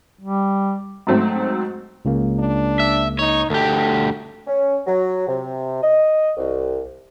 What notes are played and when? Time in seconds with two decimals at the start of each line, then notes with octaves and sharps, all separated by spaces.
0.21 G3
1.07 G#2 F#3 A3 C4
2.05 C#2 C#3 A#3
2.39 D4
2.80 E5
3.19 D#4 C#5
3.50 D2 G4 A4
4.47 C#4
4.86 F#3
5.27 C3
5.83 D#5
6.37 C2